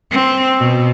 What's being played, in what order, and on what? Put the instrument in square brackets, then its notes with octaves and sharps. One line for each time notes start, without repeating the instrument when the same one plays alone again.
[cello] C4
B2